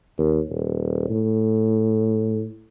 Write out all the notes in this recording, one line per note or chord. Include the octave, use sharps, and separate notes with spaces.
D#2
D#1
A2